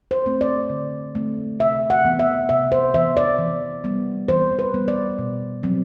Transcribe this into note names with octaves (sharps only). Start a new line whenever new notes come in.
C5
A3 C4
D5
D3
A3 C4
C3 E5
F#5
E3 B3
E5
C3 E5
C5
E3 B3 E5
D5
E3
G3 B3
E3 C5
B4
G3 B3
D5
B2
F#3 C4